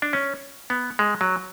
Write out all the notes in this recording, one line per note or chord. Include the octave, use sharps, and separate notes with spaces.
D4
C#4
B3
G#3
F#3